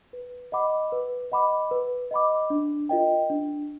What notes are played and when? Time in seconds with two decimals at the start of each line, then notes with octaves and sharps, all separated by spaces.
0.13 B4
0.52 D#5 F#5 B5 D6
0.92 B4
1.32 D#5 F#5 B5 D6
1.71 B4
2.11 D#5 F#5 B5 D6
2.50 D4
2.89 F4 A#4 D#5 G5
3.30 D4